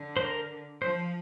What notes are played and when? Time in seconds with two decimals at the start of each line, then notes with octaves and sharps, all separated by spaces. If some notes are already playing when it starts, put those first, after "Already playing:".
Already playing: D3
0.17 C5
0.22 A#4
0.81 F3 C5